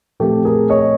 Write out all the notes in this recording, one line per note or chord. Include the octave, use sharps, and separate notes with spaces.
A#2 F3 A3 C4 G4 A4
G#4 A#4
C#5 D#5